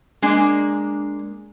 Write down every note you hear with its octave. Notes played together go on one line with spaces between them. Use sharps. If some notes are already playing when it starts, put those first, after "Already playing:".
G#3 A#3 D4